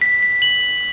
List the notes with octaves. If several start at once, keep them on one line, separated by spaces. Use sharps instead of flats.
B6
B6
F#7